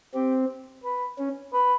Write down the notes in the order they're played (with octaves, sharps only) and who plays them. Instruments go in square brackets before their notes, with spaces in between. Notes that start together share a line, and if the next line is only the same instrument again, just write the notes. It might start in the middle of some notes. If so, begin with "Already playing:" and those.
[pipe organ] C4 [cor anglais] G4
[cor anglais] B4
[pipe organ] C#4
[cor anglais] B4